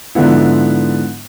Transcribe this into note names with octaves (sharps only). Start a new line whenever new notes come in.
G#2 D3 F3 B3 E4